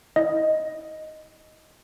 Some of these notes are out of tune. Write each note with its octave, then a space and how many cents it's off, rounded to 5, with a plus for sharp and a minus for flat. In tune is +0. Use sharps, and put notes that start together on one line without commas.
E4 -30 D#5 +0